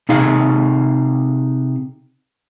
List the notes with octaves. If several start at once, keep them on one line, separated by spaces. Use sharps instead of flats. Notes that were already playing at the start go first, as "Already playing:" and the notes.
C3 D#4 G#4 F5